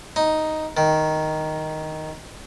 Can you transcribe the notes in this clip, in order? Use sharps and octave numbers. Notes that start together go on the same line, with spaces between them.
D#4
D#3